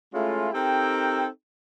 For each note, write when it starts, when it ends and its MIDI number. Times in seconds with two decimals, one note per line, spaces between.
0.14 0.50 56
0.14 0.50 57
0.14 0.50 61
0.14 0.50 64
0.14 0.50 65
0.54 1.27 60
0.54 1.27 63
0.54 1.27 67
0.54 1.27 69
0.54 1.27 70
0.54 1.27 79